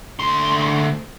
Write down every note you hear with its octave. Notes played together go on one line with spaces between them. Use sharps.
D2 C6